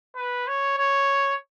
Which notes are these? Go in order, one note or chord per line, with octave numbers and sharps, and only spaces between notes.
B4
C#5
C#5